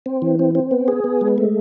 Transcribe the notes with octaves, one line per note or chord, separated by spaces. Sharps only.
C4
E3
C4
C4
B3
G#4
B3
G#3
A3